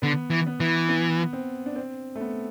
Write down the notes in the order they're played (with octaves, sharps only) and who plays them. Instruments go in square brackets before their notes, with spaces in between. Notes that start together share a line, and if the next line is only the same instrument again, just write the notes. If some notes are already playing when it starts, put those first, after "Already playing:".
[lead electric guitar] D3 [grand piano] B3
[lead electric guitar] E3
[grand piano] B3
[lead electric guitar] E3
[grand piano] B3
C4
D4
C4
A3
B3